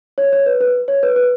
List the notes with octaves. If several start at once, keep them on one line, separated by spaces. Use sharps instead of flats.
C#5
C#5
B4
B4
C#5
B4
B4